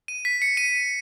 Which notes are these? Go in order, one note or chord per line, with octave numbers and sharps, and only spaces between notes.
D#7
B6
C#7
D#7